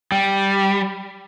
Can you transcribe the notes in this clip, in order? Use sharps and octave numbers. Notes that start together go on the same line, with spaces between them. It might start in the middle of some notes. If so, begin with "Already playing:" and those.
G3